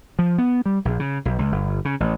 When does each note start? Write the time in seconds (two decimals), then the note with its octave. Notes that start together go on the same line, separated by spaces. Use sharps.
0.19 F3
0.38 B3
0.66 G3
0.85 A#1
1.00 C#3
1.25 B1
1.39 C#2
1.52 G1
1.85 C#3
2.00 A1